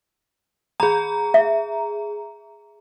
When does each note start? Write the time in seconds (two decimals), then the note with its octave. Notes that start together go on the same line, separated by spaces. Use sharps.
0.80 G#4 A#5 B5
1.34 E5